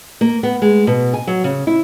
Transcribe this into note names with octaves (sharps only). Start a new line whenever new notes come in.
A#3
B3
G#3
B2
G#5
F#3
C#3
E4